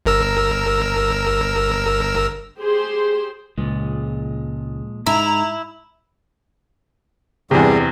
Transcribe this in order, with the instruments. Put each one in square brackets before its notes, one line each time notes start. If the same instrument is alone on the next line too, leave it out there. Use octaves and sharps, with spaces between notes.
[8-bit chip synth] G1 A#4 E6
[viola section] G4 G#4 C5 C6
[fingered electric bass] C#2 [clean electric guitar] A#2 F3 G#3
[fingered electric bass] G#2 [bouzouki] E4 [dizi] A#5
[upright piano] E2 C3 [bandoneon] G2 G3 G#4